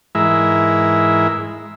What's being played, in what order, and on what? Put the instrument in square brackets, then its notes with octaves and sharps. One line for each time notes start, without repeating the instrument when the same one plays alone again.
[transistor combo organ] G#2 E3 G#3 E4 A#4 E5